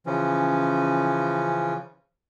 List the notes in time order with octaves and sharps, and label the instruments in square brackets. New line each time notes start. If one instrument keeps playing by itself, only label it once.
[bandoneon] C#3 E3 F3 C#4